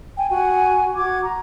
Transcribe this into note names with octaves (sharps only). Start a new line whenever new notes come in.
G5 G#5
F#4 G#5
F#4 D6 G#6
A#5